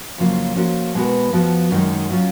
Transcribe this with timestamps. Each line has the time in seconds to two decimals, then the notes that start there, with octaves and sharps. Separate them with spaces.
0.18 F2 C#3 F#3 A#3 F4
0.55 F3 A#3 C#4 F#4 A#4
0.94 B2 G#3 B3 F#4 A#4
1.33 F2 F3 B3 F#4
1.71 F#2 D#3 G#3 D#4
2.10 F#3 C#4 F4